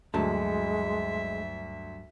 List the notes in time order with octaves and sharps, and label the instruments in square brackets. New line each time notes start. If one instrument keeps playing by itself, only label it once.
[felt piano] D2 [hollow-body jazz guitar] G2 F#3 A5 [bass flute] G#3 [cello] E5